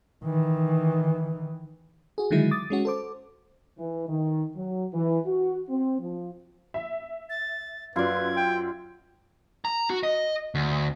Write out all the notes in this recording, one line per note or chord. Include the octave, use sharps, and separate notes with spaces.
D#3 E3
F#4 G#4
D3 D#3 F#3 G#3 E4 G#4
D6 D#6 A6
G#3 C#4 F#4
A4 C5 D6
E3
D#3
F#3
E3
F#4
C4
F3
E5
A6
F#2 F4 B4 D5 G#6
G5
A#5
F#4
D#5
D2